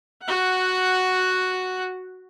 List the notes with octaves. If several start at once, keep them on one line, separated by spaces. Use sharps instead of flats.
F#4 F#5